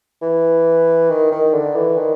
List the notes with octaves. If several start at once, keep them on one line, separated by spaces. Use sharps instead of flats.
E3
D#3
D#3
D3
E3
D#3